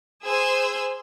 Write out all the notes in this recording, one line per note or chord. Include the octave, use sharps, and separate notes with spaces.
G#4 C5 G#5 E6